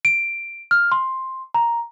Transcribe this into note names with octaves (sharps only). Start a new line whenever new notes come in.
D7
F6
C6
A#5